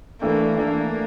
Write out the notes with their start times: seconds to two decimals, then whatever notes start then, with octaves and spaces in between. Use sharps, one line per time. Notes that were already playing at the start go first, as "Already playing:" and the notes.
0.21 E3 A3 A#3 D4 A4
0.57 E3 A3 A#3 D4 A4